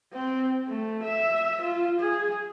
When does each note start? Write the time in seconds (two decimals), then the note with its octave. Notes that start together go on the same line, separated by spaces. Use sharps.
0.13 C4
0.67 A3
1.03 E5
1.62 F4
2.00 G#4